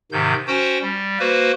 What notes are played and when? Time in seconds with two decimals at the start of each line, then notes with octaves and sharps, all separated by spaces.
0.12 G#2 C3 D#3 G6
0.47 C#4 F#4 C5 G5
0.82 G3
1.19 A#3 F#4 B4 C5